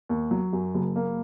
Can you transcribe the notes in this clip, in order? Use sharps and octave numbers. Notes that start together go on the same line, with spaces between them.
D#2
F#3
F#2
F#1
A#3